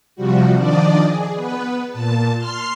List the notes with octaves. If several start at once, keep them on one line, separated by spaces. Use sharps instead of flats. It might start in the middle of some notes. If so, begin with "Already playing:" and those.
C3 F3 G3 F#4
D#3 F3 D4 D5 D#5
G#4
B3 B4
A#2 A5
C6 F6 C7